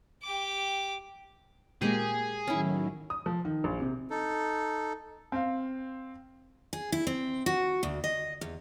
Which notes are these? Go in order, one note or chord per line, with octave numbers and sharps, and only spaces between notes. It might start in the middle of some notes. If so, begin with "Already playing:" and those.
G4 D6
A#2 G#3 A#3 G4 G#4 C5
A2 D#3 F#3 C#4 E4
D#6
F3
D#3
A#1
C3
D#4 A4
C4 F5
G#4
E4
C4
F#4
D2
D#5
E2